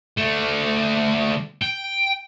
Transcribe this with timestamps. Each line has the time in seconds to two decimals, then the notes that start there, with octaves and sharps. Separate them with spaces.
0.17 D3 A3
1.62 G5